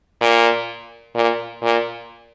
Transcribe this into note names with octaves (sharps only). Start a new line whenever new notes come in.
A#2
A#2
A#2